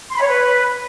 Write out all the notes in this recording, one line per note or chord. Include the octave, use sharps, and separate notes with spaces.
C6
B5
C#5
B4